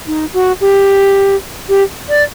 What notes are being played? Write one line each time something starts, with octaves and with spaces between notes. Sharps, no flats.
D#4
F#4
G4
G4
D5